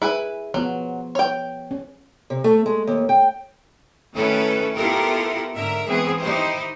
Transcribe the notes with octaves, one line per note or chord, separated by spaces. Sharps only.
E4 G#4 B4 G#5
F3 F#3 B3 F4
C#5 G5
C#4
C3
A3
G#3
D#2
G5
D#3 A3 C#4 E4 A4 B4
B3 E4 F4 G4 A4 A#4
G#2 D3 A#4 E5
E3 G#3 B3 C4 G#4
D#3 D#4 E4 G4 C5